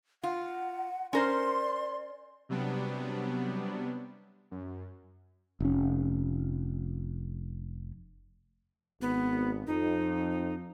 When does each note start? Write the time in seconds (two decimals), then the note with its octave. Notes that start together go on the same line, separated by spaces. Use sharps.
0.23 F4 F#5
1.13 C#4 A#4 C5 D5 C6
2.49 C3 F#3 G3 B3 D4
4.51 F#2
5.60 F1 C#4
9.02 G#1 B3
9.67 F2 D#4